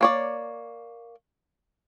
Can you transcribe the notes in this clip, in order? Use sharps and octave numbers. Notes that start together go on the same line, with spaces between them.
A#3 C#5 D5